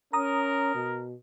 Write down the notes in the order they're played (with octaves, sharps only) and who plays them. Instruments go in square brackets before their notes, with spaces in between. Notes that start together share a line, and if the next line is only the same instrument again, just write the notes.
[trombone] C#4 [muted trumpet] A#4 [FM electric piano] A#5 D#6
[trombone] B2